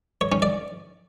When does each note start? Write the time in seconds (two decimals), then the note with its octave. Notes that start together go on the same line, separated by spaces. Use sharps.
0.21 C#5
0.32 C#4
0.42 D5